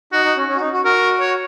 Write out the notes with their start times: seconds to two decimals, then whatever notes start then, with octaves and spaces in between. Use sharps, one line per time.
0.13 D#4 F#4
0.25 D#4
0.37 C#4
0.49 C#4
0.56 F#4
0.60 D#4
0.73 F#4
0.85 F#4 A#4
1.20 C#5